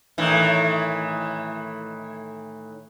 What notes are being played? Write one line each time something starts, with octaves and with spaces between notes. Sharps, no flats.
A2 D#3 E3